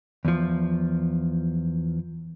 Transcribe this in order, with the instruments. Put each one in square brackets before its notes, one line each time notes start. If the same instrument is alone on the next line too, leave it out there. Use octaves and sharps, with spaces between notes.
[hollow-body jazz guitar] E2 F3